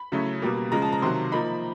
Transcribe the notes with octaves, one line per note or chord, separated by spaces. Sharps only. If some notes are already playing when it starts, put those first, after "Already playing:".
Already playing: B5
C#3 F#3 A3 C#4 E4
B2 G3 A#3
C#3 F3 G#3 A#5
A5
A#5
C3 D#3 F#3 C6
F3 A#3 D#4 B5